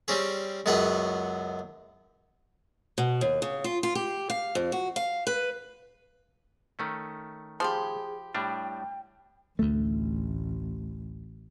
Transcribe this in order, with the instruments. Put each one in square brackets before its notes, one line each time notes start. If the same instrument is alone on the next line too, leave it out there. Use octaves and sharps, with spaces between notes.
[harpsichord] G3 C4 C#4 G#4
C#2 F#2 B3 G#4 F#5
[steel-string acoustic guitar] B2
D#2
C#3
F4
F4
G4
F5
F2
F#4
F5
B4
[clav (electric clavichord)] D#3 A3 C#4
[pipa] F3 [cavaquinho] G4 B5 C6 [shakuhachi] G#4
[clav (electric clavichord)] A2 G3 D4 [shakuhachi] G5
[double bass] A1 [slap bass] D2 A3